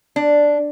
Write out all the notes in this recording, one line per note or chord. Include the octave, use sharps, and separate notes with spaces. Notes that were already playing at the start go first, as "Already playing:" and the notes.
D4